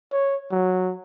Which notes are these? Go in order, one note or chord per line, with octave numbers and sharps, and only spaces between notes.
C#5
F#3